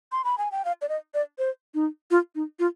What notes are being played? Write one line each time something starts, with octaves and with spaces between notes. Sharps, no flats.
C6
B5
G#5
G5
F5
D5
D#5
D5
C5
D#4
F4
D#4
F4